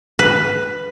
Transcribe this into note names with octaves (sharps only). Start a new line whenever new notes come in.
B4